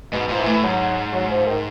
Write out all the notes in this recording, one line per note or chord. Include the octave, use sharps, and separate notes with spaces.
G#2 B2
G#2 F3
E3
A2
G#2 F#3
F#3
F3
D#3